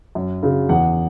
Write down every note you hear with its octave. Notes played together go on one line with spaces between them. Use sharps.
F#2
C#3 F#3
E2 F#5